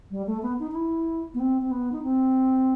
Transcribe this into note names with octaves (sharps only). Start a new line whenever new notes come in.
G3
A3
B3
D#4
D#4
E4
B3
C4
C4
B3
D#4
C4